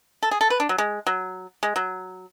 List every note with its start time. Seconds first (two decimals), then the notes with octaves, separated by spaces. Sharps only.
0.23 A4
0.31 G#4
0.41 A4
0.50 B4
0.60 D4
0.69 F#3
0.78 G#3
1.07 F#3
1.63 G#3
1.76 F#3